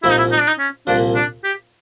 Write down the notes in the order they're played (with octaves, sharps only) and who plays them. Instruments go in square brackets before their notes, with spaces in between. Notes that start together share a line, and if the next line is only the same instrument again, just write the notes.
[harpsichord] C2 A#2 F3 [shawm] E4
[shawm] D#4
E4
D#4
D4
D#4
C#4
[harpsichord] C2 A#2 F3 [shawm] D4
[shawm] D4
G4